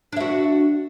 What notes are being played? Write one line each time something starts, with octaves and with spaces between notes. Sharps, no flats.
D4 F#4 E5